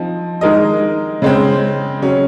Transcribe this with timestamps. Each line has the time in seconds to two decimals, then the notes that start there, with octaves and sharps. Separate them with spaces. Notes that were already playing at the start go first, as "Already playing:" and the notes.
Already playing: F3 C4 D#4
0.41 D#3 G#3 D#4 A#4 D#5
1.22 C#3 G#3 C4
2.02 C#3 F#3 C#4